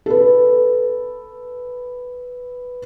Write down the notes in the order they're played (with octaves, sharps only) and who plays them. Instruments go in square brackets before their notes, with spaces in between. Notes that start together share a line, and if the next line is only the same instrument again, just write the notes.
[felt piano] A4 B4